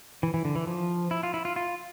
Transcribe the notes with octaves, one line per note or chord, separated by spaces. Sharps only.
E3
E3
D3
E3
F3
E4
F4
E4
F4
F4